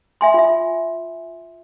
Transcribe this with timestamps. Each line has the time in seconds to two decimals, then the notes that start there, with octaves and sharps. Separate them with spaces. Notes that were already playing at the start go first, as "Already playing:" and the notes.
0.21 E5 G#5 C6
0.34 F4 E5